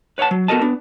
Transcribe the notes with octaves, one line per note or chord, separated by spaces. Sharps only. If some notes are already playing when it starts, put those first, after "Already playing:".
B4 C#5 D5 F#5 A5
F#3
B3 F#4 A4 A#4 D#5 A5
B3 D4